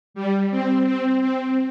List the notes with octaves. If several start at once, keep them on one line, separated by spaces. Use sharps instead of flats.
G3
C4
C4
C4